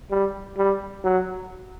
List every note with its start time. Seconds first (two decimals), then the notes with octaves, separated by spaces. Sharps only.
0.11 G3
0.57 G3
1.04 F#3